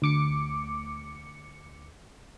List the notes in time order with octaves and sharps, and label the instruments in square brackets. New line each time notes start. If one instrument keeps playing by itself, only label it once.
[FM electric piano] D2 D6 C#7